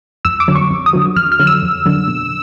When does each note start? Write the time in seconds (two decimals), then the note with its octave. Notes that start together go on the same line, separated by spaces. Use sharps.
0.25 F2 E6
0.40 D6
0.48 D3 F#3
0.56 C#6
0.71 F2
0.86 D#6
0.93 D3 F#3
1.16 F2 F6
1.32 F6
1.39 D3 F#3
1.47 E6
1.62 F2
1.86 D3 F#3
2.08 B2